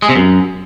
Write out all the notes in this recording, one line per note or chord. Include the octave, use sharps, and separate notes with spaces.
G#3
C3
F#2